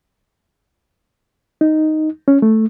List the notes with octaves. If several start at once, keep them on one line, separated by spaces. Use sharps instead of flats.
D#4
C#4
A3